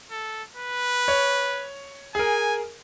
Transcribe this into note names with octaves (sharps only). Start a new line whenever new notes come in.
A4
B4
C#5
G#4 A#4 G#5